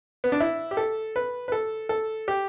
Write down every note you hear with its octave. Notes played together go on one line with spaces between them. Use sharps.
B3
D4
E4
G4
A4
B4
B4
A4
A4
G4